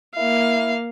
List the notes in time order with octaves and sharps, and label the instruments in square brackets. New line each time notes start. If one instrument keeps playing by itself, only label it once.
[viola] A#3 F5 [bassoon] E4